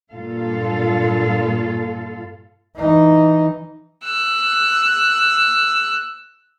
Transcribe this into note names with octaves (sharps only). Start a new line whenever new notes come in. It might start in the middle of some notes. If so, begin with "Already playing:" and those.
G2 A#2 F4 A4 F5
E3 D#4
E6 F#6